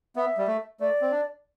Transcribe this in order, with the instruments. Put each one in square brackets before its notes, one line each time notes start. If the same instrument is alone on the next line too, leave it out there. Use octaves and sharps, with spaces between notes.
[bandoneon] B3 [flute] E5
[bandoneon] G3
A3
[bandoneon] A3 [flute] D5
[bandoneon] C4
D4